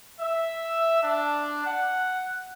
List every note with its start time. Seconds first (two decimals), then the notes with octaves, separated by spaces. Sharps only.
0.21 E5
1.03 D4
1.66 F#5